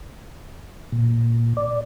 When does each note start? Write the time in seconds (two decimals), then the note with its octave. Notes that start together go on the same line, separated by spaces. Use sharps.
0.92 A#2
1.57 D5